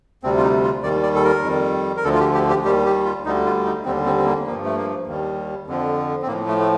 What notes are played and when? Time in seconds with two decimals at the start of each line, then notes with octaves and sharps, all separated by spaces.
0.23 D2 C3 G3 C4
0.37 F4
0.43 D#4
0.63 F4
0.83 D#2 D#3 G3 D5
1.03 D5
1.15 A4
1.24 A#4
1.43 F2 D#3 G3
1.97 A#4
2.04 D2 D3 F3 A4
2.15 F4
2.20 G4
2.34 G4
2.50 G4
2.65 D#2 D#3 G3 G4
2.86 G4
3.05 F4
3.25 D2 D3 G3 D#4
3.46 F4
3.65 D#4
3.85 D#2 D3 G3 C4
4.06 C4
4.17 C4
4.26 A#3
4.46 G2 F3 A#3
4.65 A3
4.77 A#3
5.07 D#2 D#3 G3
5.67 F2 D3 F3
6.22 C4
6.27 A2 F3 A#3
6.48 A3
6.60 A3